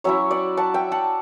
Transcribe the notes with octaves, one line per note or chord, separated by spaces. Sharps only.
F#3 C#4 E4 C#5 E5
D5 F#5
F#5 A5
E5 G5
F#5 A5